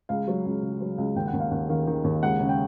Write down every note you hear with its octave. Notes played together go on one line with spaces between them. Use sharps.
C#2 F5
F#3
C#2
C#3
F#3
C#2
D#2 G5
F#5
D#2
F5
D#2 F#5
D#3 F5
D#3
D#2
C#2 F#5
C#3
G5